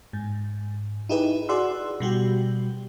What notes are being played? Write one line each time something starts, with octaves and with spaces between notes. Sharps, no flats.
G#2
D#4 E4 G4 G#4 B4
F#4 G#4 D5 F#5 C6 E6
B2 G3 F#4 G4